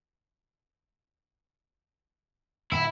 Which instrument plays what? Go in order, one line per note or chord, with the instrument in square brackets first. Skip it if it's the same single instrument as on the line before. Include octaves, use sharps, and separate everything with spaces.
[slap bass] D1 [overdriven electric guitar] E4